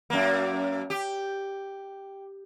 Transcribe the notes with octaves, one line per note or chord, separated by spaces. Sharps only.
F#2 A#3
G4